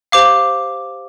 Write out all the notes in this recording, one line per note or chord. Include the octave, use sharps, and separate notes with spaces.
G4 C5 F5 D6